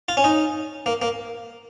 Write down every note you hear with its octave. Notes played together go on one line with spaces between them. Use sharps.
F4
C#4
D#4
A#3
A#3